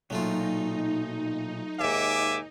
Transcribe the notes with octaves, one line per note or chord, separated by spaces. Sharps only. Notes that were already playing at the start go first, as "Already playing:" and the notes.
B1 A#2 F#3 A3 D#4 F4
D#2 G#2 E5 G#5 D6